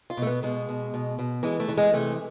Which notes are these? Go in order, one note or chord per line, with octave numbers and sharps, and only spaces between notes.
F4
B2 A3
B3
B2 G#3
B2
B2
B2
E3 G#3
A3
E3
G#3
C3 A3